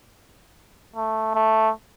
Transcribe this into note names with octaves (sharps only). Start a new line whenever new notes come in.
A3
A3